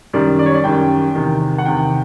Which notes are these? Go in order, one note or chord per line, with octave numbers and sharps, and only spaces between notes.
F#2 D#3 G3 D5
D5
C#5
D5
F#2 D#3 G3 G5
E2 C3 D#3
F#5
E2 C3 D#3 G5